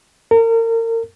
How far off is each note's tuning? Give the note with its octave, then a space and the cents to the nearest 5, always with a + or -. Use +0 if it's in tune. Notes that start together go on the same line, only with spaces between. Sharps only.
A#4 -35